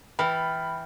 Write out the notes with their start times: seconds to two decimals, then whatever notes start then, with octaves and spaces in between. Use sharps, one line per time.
0.19 E3 G5 B5 F6 A6